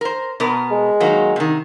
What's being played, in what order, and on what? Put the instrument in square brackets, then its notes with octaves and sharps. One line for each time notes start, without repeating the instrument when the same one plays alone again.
[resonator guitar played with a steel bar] A#4 C5
B2 B3 A#4
[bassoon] G#3
[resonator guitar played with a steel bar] D#3 F#3 A#3
C3 D#3